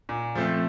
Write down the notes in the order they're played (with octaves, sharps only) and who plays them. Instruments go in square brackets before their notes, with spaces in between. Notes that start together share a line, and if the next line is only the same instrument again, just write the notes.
[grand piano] A#2
F3 A3 C4